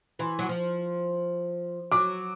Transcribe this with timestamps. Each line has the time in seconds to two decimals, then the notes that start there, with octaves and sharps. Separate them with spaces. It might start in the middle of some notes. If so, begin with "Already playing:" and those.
0.19 E3 C6
0.39 F#3
0.49 F3
1.92 F#3 D6